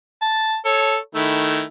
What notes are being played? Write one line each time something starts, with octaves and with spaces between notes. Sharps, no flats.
A5
A4 C#5
D#3 A3 E4